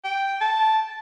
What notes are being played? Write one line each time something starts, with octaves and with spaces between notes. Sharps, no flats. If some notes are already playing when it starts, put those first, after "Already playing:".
G5
A5